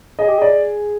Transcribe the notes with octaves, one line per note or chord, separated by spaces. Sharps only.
G#4 D#5
G4
G#4 D5